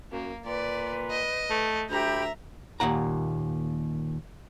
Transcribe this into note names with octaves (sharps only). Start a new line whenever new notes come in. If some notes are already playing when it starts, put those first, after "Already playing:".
F#2 A#3
A#2 B4 D5
D#5
A3
D2 G4 E5 A#5 B5 G6
D#2 A#2 F#5 A#5